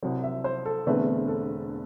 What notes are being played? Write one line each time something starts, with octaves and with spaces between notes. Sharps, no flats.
C2 C3 F#3 C4
E5
C5
A4
E1 E2 D3 A3 C4 B4
A4